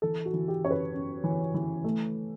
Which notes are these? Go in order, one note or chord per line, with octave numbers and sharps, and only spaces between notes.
E3 A4
F#4
E3
G4
F#2 C#5
B4
F#2
E3
E3
A3